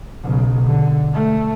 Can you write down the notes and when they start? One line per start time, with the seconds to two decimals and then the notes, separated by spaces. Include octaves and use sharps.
0.24 B1 C#3
0.65 D3
1.14 A3